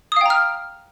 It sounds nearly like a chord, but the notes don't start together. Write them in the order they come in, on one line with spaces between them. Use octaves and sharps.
D#6 F5 G5 A#5 F6